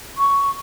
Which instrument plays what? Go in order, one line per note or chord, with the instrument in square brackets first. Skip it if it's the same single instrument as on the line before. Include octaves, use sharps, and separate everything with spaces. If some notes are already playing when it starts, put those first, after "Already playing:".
[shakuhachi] C#6